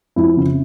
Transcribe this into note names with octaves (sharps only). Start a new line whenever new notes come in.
F2 E4
C#3